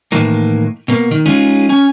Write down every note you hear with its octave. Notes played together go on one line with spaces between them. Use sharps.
A2 D#3 E3 A#3
B2 A#3
D#3
G#3 C#4 D#4 F4 G#4
C#4 G#5